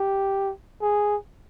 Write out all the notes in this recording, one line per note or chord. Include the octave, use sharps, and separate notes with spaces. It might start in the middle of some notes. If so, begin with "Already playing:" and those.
Already playing: G4
G#4